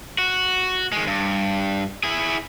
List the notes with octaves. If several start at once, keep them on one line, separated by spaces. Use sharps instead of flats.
F#4
D#3 G#3
G2
E4 G#4